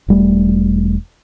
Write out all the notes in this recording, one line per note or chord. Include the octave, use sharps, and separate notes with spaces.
E1 G3 A3